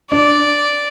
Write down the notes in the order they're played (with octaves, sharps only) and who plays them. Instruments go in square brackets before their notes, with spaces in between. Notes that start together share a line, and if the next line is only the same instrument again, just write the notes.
[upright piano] D4 [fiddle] D5